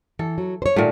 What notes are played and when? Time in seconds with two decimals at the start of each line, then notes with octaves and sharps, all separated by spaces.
0.19 E3 A4
0.38 F#3
0.62 C5 C#5
0.76 A#2 D#3 A3 F4